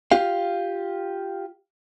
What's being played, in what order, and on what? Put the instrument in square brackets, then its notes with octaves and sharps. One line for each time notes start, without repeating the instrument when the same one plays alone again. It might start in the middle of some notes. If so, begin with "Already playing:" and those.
[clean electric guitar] F4 G4 F5